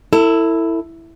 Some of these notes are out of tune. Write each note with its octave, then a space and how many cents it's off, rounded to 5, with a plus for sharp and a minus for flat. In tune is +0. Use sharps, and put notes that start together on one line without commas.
E4 +0 A4 +35